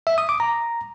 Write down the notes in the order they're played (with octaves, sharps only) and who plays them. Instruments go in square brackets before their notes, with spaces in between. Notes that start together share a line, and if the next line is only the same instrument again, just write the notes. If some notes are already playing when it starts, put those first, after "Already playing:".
[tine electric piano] E5
D#6
D6
A#5